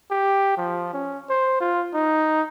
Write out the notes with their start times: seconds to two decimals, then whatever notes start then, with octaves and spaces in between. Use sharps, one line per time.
0.11 G4
0.58 F3
0.94 C#4
1.30 C5
1.61 F4
1.94 D#4